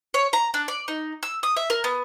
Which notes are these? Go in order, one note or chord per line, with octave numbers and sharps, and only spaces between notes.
C#5
A#5
D4
D5
D#4
E6
D#6
E5
A#4
B3